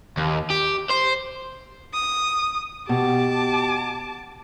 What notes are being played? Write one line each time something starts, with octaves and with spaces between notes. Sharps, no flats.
D#2
G4
C5
D#6
B2 G4 A5 D6